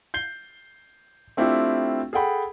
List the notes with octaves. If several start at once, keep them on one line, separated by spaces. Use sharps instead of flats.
G6 C7 G7
A3 C4 D4 E4 F4 G4
G#4 A4 F#5 G5 B5